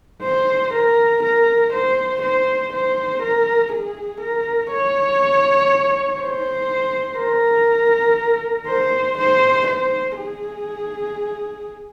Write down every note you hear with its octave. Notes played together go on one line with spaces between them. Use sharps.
C5
A#4
A#4
C5
C5
C5
A#4
G#4
A#4
C#5
C5
A#4
C5
C5
C5
G#4